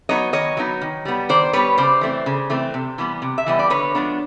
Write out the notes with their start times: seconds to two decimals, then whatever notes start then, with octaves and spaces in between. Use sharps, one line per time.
0.09 F#3 B3 D#4 C#5 D#5
0.33 D#3 C#5 D#5
0.57 F#3 B3 D#4
0.82 D#3
1.05 G3 B3
1.29 D#3 C5 D5
1.53 G3 B3 B4 C#5
1.78 C#3 C5 D5
2.01 E3 A3 C4
2.26 C#3
2.50 E3 A3 C4
2.74 C3
2.98 E3 G3 B3
3.22 C3
3.38 E5
3.46 E3 G3 B3 D#5
3.59 D5
3.70 D3 B4 C#5
3.95 F3 G#3 B3 D4